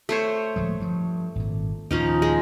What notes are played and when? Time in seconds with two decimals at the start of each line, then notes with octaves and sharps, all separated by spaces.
0.09 A3 C5 C#5
0.56 D1 F3 G#3
0.80 G2 F3
1.35 G#1 A#2
1.91 D#2 A#2 F3 C#4 D#4
2.22 G#3